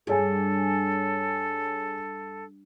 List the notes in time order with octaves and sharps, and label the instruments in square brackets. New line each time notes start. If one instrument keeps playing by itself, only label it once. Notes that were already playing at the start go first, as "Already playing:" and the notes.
[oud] G2 [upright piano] G#4 C#5 G#5 [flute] A4